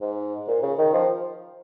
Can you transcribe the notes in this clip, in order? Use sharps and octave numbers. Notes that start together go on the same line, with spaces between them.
G#2
A#2
C#3
D#3
F3